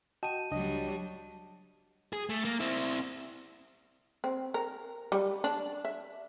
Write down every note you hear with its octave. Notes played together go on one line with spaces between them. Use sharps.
F#4 D#5 G5 A5 D#7
C#2 F#3 G3 D4 D#5
G#4
A3
A#3
C4 E4
C4
A#4
G3
D4
E5